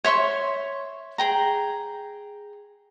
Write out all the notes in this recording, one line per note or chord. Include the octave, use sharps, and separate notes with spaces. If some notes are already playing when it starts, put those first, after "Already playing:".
C#5 E5 C6 C#6
G#4 G5 A#5